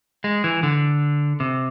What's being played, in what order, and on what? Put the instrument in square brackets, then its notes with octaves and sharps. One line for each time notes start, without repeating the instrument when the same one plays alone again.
[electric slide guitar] G#3
E3
D3
C3